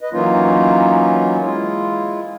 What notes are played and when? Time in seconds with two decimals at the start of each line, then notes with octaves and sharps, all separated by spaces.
0.01 B4 D#5
0.13 E3 F#3 A#3 C#4 D#4 F4
1.44 G#3 E4 F4